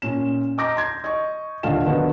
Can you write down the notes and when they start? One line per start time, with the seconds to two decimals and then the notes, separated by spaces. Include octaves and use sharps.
0.02 A#2 C#4 E7
0.58 D#5 A#5 D6 G6 A#6
0.77 C6 G#6
1.04 D#5 C#6
1.63 D#1 D3 D#3 F4 F5 E7
1.86 D3 D#3 F#3 B3